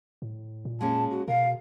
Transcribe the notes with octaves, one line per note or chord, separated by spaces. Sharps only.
A2
A#2
G#3 A#3 C#4 A5
F#4
B2 A#4 F5